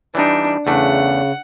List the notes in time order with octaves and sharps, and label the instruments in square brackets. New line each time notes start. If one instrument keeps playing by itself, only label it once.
[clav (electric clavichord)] E3 G3 D#4 [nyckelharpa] D4
[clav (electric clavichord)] E2 A3 D4 [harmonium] C#3 [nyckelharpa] F#5